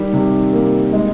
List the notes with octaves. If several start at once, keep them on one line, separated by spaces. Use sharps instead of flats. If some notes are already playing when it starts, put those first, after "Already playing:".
Already playing: D#3 G3
C3
A#3
G#3